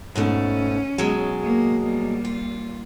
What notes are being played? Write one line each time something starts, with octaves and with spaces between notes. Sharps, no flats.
G#2 B2 A3 C#4
B2 F#3 G#3
A#3
G3 A#3
F4